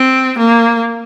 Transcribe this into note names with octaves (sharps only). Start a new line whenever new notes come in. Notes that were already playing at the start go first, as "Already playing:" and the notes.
Already playing: C4
A#3